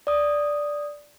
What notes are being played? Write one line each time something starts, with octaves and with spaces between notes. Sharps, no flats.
D5 D#6